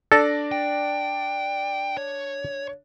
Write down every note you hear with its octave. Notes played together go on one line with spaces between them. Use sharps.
D4 A4 D5 A#6
G5
C#5